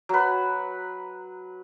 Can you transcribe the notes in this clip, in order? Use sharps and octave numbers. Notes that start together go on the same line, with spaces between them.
F#3 B4